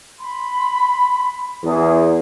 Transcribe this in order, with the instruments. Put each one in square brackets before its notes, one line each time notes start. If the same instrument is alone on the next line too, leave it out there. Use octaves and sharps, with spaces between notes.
[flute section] B5 C6
[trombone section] E2 [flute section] G#4